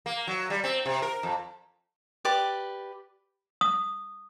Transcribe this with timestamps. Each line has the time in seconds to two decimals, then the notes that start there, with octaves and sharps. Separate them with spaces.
0.06 A#3
0.27 F#3
0.50 G3
0.64 C4
0.86 C3
1.02 A#4
1.23 F2
2.25 G4 B4 D5 D6
3.61 D#6